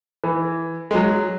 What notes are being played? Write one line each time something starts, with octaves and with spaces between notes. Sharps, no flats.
E3
G#3
F#3